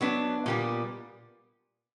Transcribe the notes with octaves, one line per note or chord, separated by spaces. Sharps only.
F#3 B3 D4
A#2 G3 B3